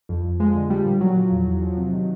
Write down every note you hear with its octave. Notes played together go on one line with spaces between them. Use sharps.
F2
F2
F3 G#3
D3
F3 G3
A#2
A#2 F#3
F3
E2
E2
F3
C3
D#3